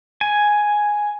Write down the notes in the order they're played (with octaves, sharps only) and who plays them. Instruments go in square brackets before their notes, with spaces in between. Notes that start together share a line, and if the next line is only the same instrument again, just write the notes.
[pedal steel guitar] G#5